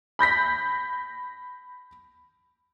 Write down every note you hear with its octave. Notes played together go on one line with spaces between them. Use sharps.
B5 G6 A#6 B6